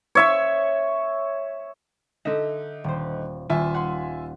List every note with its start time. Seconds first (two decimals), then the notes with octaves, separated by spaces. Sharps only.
0.15 C#5 E5 C#6
2.25 D3 D#4 D#5 E5 A#6
2.84 D#1 C5
3.50 D#1 F4 E5 G#5
3.74 F#5 C6